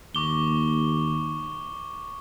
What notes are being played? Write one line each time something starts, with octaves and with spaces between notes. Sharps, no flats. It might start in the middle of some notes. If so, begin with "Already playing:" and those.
D#2 C#6 D6 G7